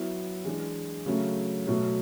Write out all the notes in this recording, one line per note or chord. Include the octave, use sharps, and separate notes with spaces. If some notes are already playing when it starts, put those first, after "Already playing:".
Already playing: F#3 B3 E4
E3 G#3 D4
C#3 F#3 A3
B2 F#3 A3